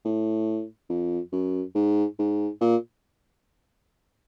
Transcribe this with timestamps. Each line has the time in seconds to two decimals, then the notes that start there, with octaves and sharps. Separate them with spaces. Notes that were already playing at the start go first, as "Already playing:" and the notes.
0.05 A2
0.89 F2
1.32 F#2
1.75 G#2
2.19 G#2
2.61 A#2